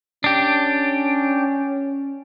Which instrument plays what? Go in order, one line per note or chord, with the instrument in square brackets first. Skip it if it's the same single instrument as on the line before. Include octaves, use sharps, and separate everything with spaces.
[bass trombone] C#4 [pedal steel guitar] D4 G4